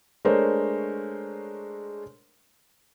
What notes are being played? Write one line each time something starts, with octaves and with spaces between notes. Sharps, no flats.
G#3 A3 D4 A#4 C5 C#5